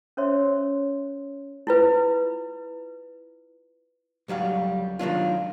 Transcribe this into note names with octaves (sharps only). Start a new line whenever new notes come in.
C#4 A#4 C5 C#5 E5 C6
E4 F4 B4
C#2 F#3 G3 F5
D#3 F#3 D4 F4